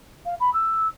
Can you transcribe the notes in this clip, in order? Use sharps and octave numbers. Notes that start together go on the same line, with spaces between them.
F5
B5
E6